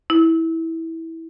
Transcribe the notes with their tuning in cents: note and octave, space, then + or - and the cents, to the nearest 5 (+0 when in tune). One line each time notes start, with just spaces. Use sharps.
E4 -15